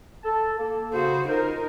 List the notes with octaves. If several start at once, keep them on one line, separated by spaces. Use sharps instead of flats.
A4 A5
A#3 A4
C#3 F#4 C5
D#4 F4 A#4 C5